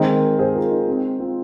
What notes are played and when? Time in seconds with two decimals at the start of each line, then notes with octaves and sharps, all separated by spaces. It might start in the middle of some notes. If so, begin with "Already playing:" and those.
Already playing: D#3 G#3 C4 A#4 D#5
0.39 G#4 C5
0.54 F4 A#4
0.71 D#4
0.87 C4
1.19 C4 F4